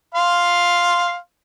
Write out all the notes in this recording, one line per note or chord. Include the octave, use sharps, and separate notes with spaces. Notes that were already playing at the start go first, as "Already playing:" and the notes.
F5 C6